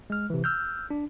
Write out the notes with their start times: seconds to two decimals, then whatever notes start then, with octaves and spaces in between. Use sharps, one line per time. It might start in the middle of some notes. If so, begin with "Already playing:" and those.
0.10 G#3 F6
0.30 C3 E3
0.44 E6 F6 G6
0.90 D4